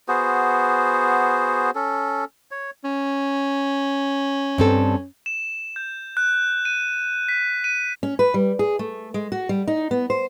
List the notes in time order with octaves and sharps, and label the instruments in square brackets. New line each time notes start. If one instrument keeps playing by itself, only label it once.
[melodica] B3 F#4 G#4 C5
C#4 A4
C#5
[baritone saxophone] C#4
[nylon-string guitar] G2 C4 A4
[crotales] E7
G6
F#6
D#7
B6
D#7
[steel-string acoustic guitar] C#4
B4
G3
G#4
A3
G#3
F#4
G3
D#4
B3
C5